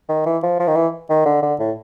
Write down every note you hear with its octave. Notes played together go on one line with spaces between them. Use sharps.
D#3
E3
F3
F3
D#3
E3
D#3
D3
D3
A2